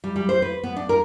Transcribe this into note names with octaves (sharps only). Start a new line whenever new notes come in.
G3
G3
C5
B4
B3
D4
A#4